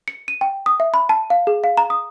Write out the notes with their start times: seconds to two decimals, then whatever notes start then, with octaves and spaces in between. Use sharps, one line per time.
0.08 C#7
0.28 D#7
0.41 G5
0.66 D#6
0.80 E5
0.94 B5
1.09 A5
1.30 F5
1.47 G#4
1.64 F5
1.77 A#5
1.90 D#6